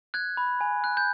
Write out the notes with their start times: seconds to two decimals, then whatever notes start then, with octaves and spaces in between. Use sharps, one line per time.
0.14 F#6 G#6
0.37 B5
0.61 G#5
0.84 F#6
0.97 G6